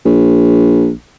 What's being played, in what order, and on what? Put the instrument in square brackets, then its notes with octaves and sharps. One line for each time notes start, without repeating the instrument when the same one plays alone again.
[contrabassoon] A#1